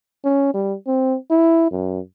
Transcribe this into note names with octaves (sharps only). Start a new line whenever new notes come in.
C#4
G3
C4
E4
F#2